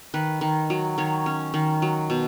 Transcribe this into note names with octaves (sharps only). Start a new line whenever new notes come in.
D#3 B4
D#3
F#3
D#3 C#5
C#4
D#3
F#3
B2